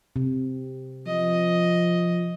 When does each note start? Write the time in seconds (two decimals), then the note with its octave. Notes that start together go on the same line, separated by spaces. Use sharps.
0.16 C3
1.07 F3 D#5